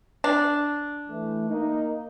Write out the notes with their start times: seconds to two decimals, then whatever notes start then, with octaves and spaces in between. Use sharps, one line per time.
0.24 D4
1.09 E3 A3
1.48 A#3 D#4